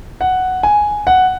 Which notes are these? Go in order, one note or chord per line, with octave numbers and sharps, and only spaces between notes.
F#5
G#5
F#5